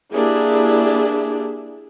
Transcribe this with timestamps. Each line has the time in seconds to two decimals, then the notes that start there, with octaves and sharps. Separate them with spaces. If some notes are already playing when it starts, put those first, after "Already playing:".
0.14 A#3 D4 E4 G4 G#4